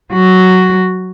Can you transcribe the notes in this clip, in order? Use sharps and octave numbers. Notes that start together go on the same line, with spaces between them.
F#3 F#4